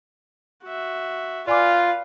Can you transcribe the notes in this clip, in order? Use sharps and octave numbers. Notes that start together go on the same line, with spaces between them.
F#4 E5
F4 B4 D5 F5 G#5 D6